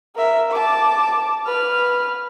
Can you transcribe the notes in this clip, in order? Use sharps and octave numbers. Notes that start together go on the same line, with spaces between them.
A#4 E5
A5 D6
B4 F6